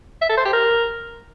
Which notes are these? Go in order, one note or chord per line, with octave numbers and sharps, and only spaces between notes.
E5
A4
C5
G4
A#4